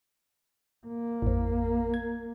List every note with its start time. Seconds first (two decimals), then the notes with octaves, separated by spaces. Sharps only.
0.87 A#3
1.22 A1 F2
1.94 G#6